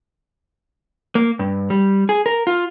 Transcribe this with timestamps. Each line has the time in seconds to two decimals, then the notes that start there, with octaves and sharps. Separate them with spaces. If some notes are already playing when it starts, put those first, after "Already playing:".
1.15 A#3
1.39 G2
1.70 G3
2.09 G#4
2.26 A#4
2.47 F4